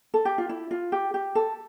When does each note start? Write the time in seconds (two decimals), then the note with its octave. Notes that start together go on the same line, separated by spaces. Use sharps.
0.14 A4
0.25 G4
0.38 F4
0.49 E4
0.71 F4
0.92 G4
1.14 G4
1.35 A4